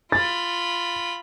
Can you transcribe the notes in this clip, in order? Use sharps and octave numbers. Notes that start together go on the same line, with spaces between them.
F4 B5 A6